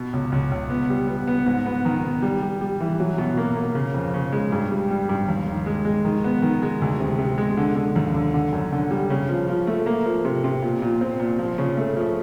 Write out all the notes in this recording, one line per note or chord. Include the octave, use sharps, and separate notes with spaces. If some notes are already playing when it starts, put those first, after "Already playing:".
Already playing: B2
C#2
C#2
C#2
B3
G3
B3
B3
G#2
B3
D#3
B3
G3
G3
G3
E3
F#3
B2
A#3
A#3
C#3
F2
C#3
G#3
G2
G3
G3
G2
D#2
D#3
G#3
G#3
D#3
B3
D#3
G#3
D2
C3
C3
G#3
D3
D3
D#2
D3
D3
F#2
D3
G3
C#3
F3
F3
A3
A#3
F3
C3
C3
A#2
A#2
C4
A#2
F3
C#3
A3
F3